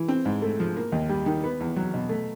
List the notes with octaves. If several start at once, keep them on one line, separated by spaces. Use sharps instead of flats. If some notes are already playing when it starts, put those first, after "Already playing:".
Already playing: E3
C4
G#2
A3
F3
A#3
D#2
G3
D#3
B3
E2
F#3
B2
A3